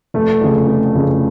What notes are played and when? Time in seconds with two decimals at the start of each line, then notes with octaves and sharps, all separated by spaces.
0.14 F1 A3
0.41 F2 C#3
0.67 F1
0.94 F2 C#3